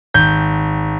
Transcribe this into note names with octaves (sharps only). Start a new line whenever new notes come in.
G#1 G6